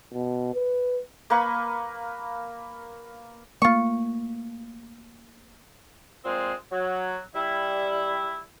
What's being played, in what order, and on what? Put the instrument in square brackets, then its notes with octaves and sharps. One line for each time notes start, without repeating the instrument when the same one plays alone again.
[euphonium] B2
B4
[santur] A#3 B4 B5 C#6
[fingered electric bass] A3 A#3 [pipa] F4 C#6
[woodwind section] A#2 F3 G#3 C4
F#3
G3 E4